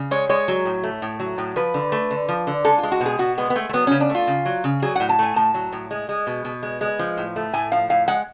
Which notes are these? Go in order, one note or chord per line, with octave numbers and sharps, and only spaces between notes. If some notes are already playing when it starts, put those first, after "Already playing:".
Already playing: C#3
G#3 C#5
G#3 C#5
F#3
A2
A3
A2
F#3
A2
F3 B4
D3
A3
D3
F3
D3
G#3 A4
F4
G#3
F#4
B2
G#4
B2 F#4
G#3 B3
B3
G#3 A3
A3
F#3 B3
C#3 C#4
D4
A3 F4
C#3
F#3
C#3
F#3 G#4
A2 F#5
A5
A3 G#5
A2 A5
F#3
A2
G#3
G#3
B2
B2
G#3
G#3
F3
A2
A3
A2 G#5
F3 F5
A2 F5
G#3 F#5